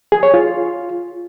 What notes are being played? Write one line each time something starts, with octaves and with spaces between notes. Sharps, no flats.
G#4
C#5
F4